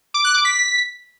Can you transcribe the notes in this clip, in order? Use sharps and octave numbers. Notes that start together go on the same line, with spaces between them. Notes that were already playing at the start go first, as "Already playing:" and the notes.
D6
F#6
D6
B6